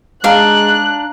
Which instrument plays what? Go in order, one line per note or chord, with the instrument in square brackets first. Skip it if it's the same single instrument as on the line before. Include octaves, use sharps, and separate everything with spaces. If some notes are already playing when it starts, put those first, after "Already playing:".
[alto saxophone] G#3 [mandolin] D4 F6 [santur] F5 A#5 [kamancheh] F#6